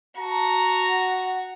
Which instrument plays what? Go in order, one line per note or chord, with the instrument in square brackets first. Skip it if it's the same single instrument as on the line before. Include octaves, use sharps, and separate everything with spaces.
[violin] F#4 [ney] A5 [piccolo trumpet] A#5
[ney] F#5